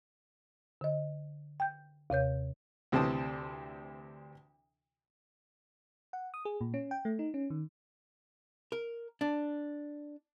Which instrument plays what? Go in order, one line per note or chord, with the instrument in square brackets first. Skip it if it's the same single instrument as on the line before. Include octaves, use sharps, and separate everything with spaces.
[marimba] D3 D#5
G5 G6
D#2 C3 C#5 G6
[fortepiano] D2 C3 E3 C4 A5 D#6
[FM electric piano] F#5
D#6
G#4
A#2
C#4
G5
A3
D#4
C#4
D#3
[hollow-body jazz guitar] A#4
D4